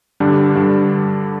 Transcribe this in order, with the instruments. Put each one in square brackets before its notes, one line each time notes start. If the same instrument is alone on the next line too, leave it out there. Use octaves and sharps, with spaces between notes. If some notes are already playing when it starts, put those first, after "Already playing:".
[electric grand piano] G2 D3 G3 D4
G2 D3 G3 D4